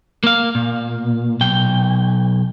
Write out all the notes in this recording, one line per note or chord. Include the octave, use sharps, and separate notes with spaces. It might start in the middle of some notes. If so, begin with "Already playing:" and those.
A#3 F5
A#2
B1 G5